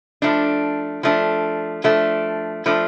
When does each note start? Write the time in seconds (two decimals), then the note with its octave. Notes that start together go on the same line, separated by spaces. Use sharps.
0.22 F3 A3 D4
1.03 F3 A3 D4
1.84 F3 A3 D4
2.66 F3 A3 D4